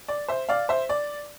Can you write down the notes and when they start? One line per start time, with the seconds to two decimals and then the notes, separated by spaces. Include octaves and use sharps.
0.08 D5
0.28 C5 E5
0.49 D5 F5
0.69 C5 E5
0.89 D5